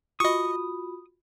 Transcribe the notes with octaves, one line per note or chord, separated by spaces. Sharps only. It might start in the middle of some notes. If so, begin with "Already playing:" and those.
F4 F#4 D#5 B5 C#6 D#6